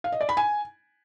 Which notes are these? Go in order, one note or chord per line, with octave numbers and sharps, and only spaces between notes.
F5
D#5
D5
B5
G#5